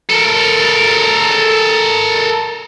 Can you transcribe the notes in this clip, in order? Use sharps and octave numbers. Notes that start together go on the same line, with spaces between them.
A4 A#4